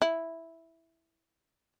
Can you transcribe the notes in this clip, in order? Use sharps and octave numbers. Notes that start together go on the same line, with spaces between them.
E4